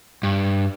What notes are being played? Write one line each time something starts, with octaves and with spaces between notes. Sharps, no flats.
G2